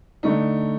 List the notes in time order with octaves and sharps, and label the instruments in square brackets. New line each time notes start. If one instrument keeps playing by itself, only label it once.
[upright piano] D3 A3 D#4